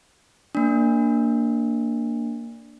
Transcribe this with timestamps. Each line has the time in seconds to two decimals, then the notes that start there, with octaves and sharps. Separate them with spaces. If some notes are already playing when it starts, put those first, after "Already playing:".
0.55 A#3 D4